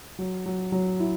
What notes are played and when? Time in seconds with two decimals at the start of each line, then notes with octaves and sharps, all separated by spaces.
0.19 F#3
0.46 F#3
0.72 F#3
1.00 E4